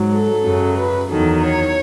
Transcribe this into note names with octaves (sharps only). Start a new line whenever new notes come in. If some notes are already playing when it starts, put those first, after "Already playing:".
Already playing: G#2 F#3
A4
F#2 C#3 F#3
B4
E2 D#3 F#3 A4
C#5